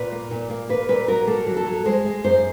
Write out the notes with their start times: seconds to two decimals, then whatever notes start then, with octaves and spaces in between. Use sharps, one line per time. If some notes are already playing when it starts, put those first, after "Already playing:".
Already playing: A#2 B4
0.12 A#3
0.31 A#2
0.50 A#3
0.69 A#3 B4
0.89 A#2 B4
1.08 F#3 A#4
1.27 A#3 A4
1.47 F#3
1.57 A4
1.67 F#3
1.86 G#3 C5
2.05 G#3
2.24 F#2 C5